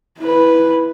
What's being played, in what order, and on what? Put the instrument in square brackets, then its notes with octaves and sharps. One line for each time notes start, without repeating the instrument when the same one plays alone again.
[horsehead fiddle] E4 B4